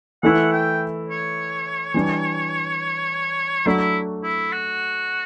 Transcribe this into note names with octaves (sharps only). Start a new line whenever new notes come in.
E3 A3 E4 F#5
G5
C#5
E3 G3 D4
F#3 A3 D4 E4 F#4
E4
F#4